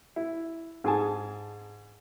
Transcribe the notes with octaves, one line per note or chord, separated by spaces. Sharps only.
E4
G#2 G#4 G#5 A5